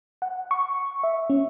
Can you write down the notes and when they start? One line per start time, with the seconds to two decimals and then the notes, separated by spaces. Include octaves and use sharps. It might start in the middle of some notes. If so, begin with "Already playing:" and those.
0.22 F#5
0.51 C#6
1.03 E5
1.30 C#4